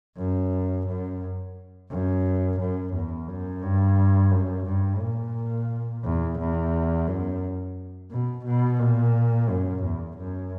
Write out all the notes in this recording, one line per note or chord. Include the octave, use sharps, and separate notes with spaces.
F#2
F#2
F#2
F#2
E2
F#2
G2
F#2
G2
A#2
E2
E2
F#2
B2
B2
A#2
F#2
E2
F#2